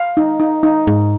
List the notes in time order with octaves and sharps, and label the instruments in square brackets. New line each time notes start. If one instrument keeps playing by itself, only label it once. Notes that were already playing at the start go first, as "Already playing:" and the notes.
Already playing: [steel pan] F5
D#4
D#4
D#4
[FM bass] G#2 [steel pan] D#4